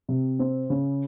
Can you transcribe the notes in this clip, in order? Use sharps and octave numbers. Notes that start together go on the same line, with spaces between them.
C3
C4
C#3